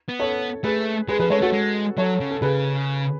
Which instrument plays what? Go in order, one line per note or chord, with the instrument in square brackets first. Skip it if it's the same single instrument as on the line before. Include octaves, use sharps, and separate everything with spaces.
[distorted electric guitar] B3
[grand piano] A4 C#5
[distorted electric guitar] A3 [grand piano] G#4 B4
[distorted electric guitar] G#3 [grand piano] G#4 B4
[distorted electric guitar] F3 [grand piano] G#4 B4
[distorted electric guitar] G#3 [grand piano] A4 C#5
[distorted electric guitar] A3 [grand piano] F#4 A4
[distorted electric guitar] G#3
[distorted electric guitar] F#3 [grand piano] A4 C#5
[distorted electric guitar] C#3
[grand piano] A4
[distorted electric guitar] C#3 [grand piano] G#4 B4